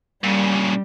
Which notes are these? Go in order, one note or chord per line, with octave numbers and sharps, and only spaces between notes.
A#2 C#3 G3